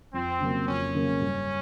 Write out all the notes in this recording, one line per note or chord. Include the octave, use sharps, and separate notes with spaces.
F2 C4
C#3 F#3 A#3
F2 C#4
C#3 F#3 A#3
G2